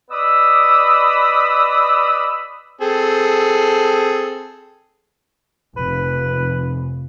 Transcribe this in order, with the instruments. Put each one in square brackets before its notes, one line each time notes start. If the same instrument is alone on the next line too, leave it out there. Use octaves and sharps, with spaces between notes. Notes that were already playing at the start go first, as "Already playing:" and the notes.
[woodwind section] B4 D5 D#5 B5 D#6 E6
[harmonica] C4 G#4 A4
[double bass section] F1 [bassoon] B4